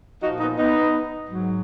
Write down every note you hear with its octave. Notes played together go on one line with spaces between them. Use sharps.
A#2 F3 D#4 F#4
B3 D#4
B3 D#4
G#2 F#3